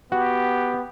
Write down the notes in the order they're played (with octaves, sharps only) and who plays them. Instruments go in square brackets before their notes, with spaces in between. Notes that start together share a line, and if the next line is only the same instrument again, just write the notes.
[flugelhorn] B3 [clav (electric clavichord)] F#4 [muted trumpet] G4